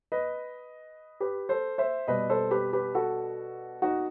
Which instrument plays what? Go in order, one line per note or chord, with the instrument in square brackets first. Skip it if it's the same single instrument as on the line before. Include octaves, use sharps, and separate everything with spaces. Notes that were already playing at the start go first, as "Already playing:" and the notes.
[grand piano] B4 D#5
G4 B4
A4 C5
C5 E5
B2 G3 B4 D#5
A4 C5
G4 B4
G4 B4
F#4 A4
D#4 F#4